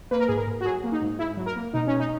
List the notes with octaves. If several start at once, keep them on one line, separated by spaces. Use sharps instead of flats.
A#3 B4
A#4
G#2 G#4
A#4
G#2
F#4
F#3 G#4
A#3
D#4
G#2
G#2 E4
F#3
A#4
A#3
B2 D#4
G#3 C#4
D#4